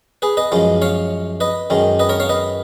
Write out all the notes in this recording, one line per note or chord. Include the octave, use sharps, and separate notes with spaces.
G#4 B4
B4 D#5
F#2 F3 G#3
C#5 F5
B4 D#5
F#2 D#3 G#3
B4 D#5
A#4 C#5
C#5 F5
B4 D#5